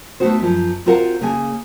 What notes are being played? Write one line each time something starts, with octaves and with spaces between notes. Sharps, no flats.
A3 B3 D4 D#4 F#4 C5
F#2 F3
C4 F4 F#4 A#4 F5 F#5
C#3 A#3 G#4 G#5